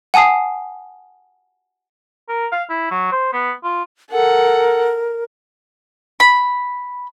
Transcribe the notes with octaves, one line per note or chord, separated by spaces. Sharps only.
F#5 G#5 A5 D#6 C7
A#4
F5
E4
F#3
C5
B3
F4
A4 A#4 F#5
B5